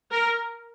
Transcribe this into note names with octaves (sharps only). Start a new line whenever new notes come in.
A#4